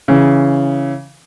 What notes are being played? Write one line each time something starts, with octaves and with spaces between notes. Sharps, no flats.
C#3 E3